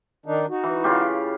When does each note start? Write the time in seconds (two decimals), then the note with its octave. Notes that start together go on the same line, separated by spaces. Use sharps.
0.26 D#3 D4 D#4
0.50 D#4 F#4
0.64 E3
0.84 C#3 F4 G4